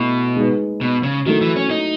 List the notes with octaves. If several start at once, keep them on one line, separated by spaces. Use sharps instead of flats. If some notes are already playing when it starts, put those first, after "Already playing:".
Already playing: B2 A3 E4
G#3 D#4 G#4 B4
B2
C#3
D#3 F#3 A3 E4 A4
E3
C#4
D#4